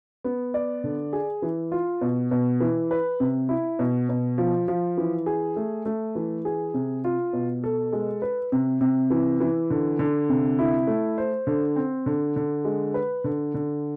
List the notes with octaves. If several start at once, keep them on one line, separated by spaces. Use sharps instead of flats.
B3
D5
D3
G#4
E3
F4
B2
B2
E3
B4
C3
E4
B2
B2
F3
F3
E3
G#4
A3
A3
E3
G#4
C3
F4
B2
A4
G#3
B4
C3
C3
E3
E3
D3
D3
C3
E4
A3
C5
D3
C4
D3
D3
G#3
B4
D3
D3